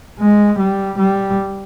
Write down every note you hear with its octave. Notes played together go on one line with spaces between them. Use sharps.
G#3
G3
G3